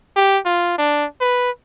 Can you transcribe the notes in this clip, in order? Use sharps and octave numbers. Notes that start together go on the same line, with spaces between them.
G4
F4
D4
B4